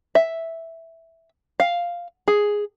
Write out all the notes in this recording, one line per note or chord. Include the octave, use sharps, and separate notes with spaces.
E5
F5
G#4